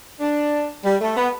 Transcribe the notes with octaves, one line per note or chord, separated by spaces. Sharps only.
D4
G3
A3
B3